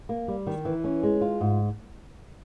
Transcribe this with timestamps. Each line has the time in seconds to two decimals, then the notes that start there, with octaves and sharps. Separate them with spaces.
0.09 A#3
0.28 G3
0.47 D#3
0.65 E3
0.84 C#4
1.03 G#3
1.21 F4
1.41 G#2